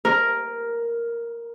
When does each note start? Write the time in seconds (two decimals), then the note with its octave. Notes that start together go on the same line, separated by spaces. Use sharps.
0.05 A#4